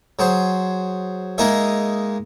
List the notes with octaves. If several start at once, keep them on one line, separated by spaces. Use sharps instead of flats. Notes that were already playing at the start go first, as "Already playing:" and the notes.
F#3 G#4 C5
G#3 A#3 D#4 G#4 D#5 E5